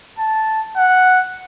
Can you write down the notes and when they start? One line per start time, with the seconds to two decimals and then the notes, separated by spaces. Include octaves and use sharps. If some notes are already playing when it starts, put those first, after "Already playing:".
0.18 A5
0.77 F#5